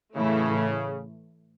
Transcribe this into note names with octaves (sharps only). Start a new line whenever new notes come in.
A2 C#3 E3 A3 E4